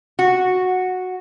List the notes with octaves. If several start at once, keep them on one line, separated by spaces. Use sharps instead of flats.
F#4